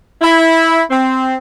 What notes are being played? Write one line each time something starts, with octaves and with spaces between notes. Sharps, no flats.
E4
C4